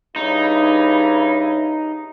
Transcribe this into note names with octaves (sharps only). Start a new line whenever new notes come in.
G2 C#3 D#4 E4